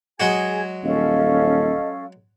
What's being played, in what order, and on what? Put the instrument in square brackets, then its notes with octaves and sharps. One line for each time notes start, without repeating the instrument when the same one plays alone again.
[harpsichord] F#3 G#3 F#4 [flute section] G#4 G#5 G#6
[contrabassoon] D#1 [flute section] C#4 A4 F5 [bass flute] D#5